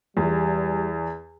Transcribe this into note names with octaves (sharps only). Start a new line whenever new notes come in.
E2 G3